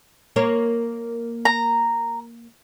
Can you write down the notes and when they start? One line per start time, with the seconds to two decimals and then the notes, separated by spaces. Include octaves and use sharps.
0.36 A#3 A#4 C#5
1.45 A#5